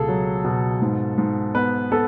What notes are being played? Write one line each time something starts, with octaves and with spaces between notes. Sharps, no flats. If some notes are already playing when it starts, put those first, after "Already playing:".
Already playing: C#2 B2 G#4 A4
F#3
B2
G#2
G#2
B3 B4
B3 A4